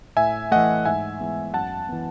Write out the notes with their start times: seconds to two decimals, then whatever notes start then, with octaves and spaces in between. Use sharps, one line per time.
0.17 A2 E5 G#5
0.51 E3 A3 D#5 F#5
0.85 G#2 E5 G#5
1.20 E3 G#3 B3
1.54 F#2 F#5 A5
1.89 E3 B3